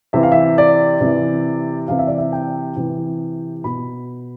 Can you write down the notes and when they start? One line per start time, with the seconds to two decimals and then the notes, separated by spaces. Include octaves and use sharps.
0.13 C3 E3 E5
0.23 F5
0.32 E5
0.58 D5
1.01 C3 E3
1.88 C3 E3 F5
1.99 E5
2.07 D5
2.18 E5
2.33 G5
2.77 C3 E3
3.64 B2 B5